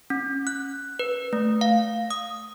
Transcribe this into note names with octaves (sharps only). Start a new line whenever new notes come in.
C#4
F#6
B4
A3
F5
D#6